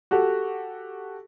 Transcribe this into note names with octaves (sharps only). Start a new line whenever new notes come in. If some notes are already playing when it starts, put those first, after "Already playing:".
F#4 G4 A4